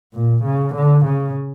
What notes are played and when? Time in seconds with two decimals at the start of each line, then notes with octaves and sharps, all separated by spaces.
0.13 A#2
0.44 C#3
0.74 D3
1.05 C#3